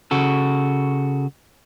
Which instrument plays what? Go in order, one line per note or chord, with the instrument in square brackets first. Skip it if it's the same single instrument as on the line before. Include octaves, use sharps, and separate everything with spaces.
[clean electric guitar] C#3 F#4 A4